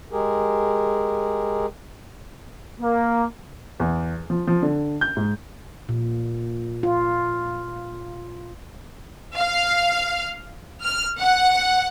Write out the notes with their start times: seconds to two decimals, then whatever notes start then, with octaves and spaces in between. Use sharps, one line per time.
0.12 G#3 G4 G#4 A#4
2.80 A#3
3.80 E2
4.30 F3
4.47 F3
4.62 D3
5.01 G6
5.17 G#2
5.89 A#2
6.83 F4
9.37 F5
10.83 F6
11.19 F#5